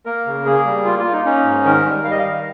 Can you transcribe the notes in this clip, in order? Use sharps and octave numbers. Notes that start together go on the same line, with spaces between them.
A#3 A#4
C#3
A#3 G#4
G3
A#3 F4
F4
A#3
D#4
C#4 D#4
G#2
D#3 A#4
G3
G3 F5
D#5
D#3 F5